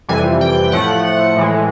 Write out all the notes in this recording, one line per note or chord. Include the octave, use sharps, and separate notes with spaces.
F2 C3 E3 G3 G#5
G5
A2 F3 A3 F#5
A2 E3 G#3